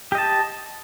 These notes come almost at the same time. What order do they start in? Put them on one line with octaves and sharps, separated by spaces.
G4 D#5 A5